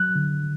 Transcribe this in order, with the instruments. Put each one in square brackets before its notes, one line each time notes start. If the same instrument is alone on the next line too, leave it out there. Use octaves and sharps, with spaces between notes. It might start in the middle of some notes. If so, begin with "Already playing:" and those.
Already playing: [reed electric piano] F#3 F#6
D3